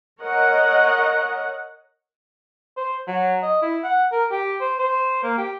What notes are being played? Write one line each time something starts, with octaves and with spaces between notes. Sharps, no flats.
A#4 C#5 D#5 F#5
C5
F#3
D#5
E4
F#5
A#4
G4
C5
C5
A#3
G4